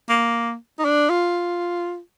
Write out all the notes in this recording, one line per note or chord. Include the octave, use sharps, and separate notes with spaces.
A#3
D#4
D4
F4